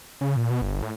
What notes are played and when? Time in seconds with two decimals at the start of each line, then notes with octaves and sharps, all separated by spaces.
0.21 C#3
0.36 A#2
0.50 B2
0.62 G1
0.82 A2